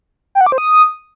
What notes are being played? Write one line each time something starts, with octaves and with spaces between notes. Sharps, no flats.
G5
F#5
D6
C5
D#6